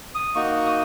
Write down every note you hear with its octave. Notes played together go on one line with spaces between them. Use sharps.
D#6
A#3 D#4 F#4 C#6
D#6